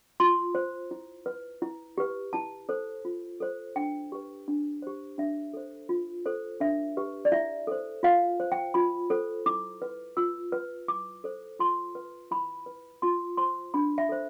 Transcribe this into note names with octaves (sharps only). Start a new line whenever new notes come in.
F4 C6
C5
E4
B4
E4
G4 B4
E4 A5
A4 C5
F4
A4 C5
D4 G5
G4 B4
D4
G4 C5
D4 E5
A4 C5
F4
A4 C5
D4 E5
G4 B4
D5
E4 E5
A4 C5
F4 F5
C5
G5
F4 B5
A4 C5
E4 D6
B4
F4 E6
B4
E4 D6
A4 C5
F4 C6
B4
E4 B5
B4
F4 C6
C5 C6
D4 B5
E5
A4 C5